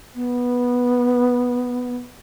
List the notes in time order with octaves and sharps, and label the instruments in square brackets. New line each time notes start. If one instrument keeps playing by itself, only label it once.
[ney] B3